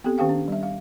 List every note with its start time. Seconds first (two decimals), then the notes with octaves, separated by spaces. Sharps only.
0.04 B3 C4 G4 A4
0.18 D#3 C#4 G4 F5 G5
0.29 D4
0.48 G3 E5
0.63 F5